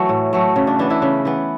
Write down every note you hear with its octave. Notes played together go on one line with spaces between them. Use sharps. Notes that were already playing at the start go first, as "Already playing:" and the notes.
Already playing: E3 F#3 A3 E4
A2
F#3 A3
C#3
D4
E3 B3 D4
E3 E4
C#3
E3 B3